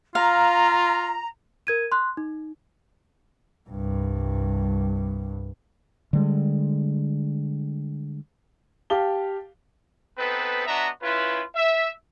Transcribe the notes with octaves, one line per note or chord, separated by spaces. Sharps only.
F4 F5 A#5
A#4 G#6 D#7
C6 F#6
D#4
C2 G2
D3 G3 G#3
G4 F5 A5 G7
B3 C4 D#4 A4 B4
B3 D4 F#4 D#5 E5 A#5
C#4 E4 F4 B4
E5